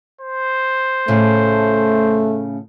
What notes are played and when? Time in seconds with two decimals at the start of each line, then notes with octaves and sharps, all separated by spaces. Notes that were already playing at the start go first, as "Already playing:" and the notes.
0.21 C5
1.08 A2 C#3 A3